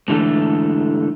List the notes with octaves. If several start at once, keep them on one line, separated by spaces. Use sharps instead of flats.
G#2 D3 E3 A3 A4